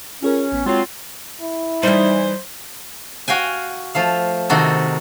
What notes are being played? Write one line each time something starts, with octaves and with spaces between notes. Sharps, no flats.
C#4 F4 G#4 A#4
A1 B3
F#3 G#3 C4 F4 C#5 C7
E4
E3 G3 D#4 C5
F#4 F5 G5 G#5
F3 A3 F5
C3 D#3 F#4 A4